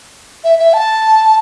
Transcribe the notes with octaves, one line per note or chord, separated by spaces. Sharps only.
E5
E5
A5